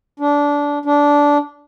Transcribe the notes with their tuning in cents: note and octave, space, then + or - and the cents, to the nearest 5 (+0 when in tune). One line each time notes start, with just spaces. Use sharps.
D4 -20
D4 -15